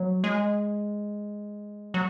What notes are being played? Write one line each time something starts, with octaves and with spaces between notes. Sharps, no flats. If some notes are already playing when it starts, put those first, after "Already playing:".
Already playing: F#3
G#3
F#3